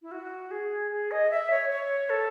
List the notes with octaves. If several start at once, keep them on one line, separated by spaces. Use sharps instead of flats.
E4
F#4
G#4
G#4
D#5
E5
C#5
C#5
A4